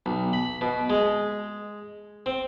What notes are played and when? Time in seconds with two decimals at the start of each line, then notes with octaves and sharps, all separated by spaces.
0.06 B1
0.33 B5
0.61 B2
0.90 G#3
2.26 C4